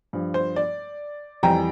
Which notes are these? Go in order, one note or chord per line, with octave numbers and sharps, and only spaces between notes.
G2 F3
C5
D5
F2 E3 G3 G5 A#5